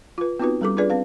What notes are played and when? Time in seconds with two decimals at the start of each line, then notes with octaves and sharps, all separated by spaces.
0.18 F4 B4
0.40 B3 C4 D#4 F4 F#4 B4
0.61 G3 C#4 G4 A4 A#4 D6
0.77 D4 F4 G#4 B4 D5
0.90 C4 B4 F5